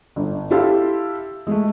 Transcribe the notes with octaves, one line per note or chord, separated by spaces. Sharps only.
G1
E4 G4 A4 F5 C6 E6
G#3 A3